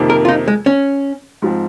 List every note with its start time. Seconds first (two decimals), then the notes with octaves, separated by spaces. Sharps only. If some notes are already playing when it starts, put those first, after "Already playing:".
Already playing: F2 C3 D#3 A#3
0.10 A#4
0.25 F4
0.28 D#4
0.48 G#3
0.66 C#4
1.42 G#2 F3 C4